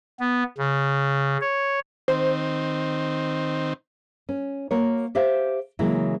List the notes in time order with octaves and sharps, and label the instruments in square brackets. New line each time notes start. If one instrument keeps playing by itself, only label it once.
[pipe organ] B3
C#3
C#5
[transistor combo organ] D#3 C4 [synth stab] C5
[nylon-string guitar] C#4
A#3 F#4 A#4 C#5
G4 C5 E5 F5
C#3 E3 F#3 G#3 A#3 E4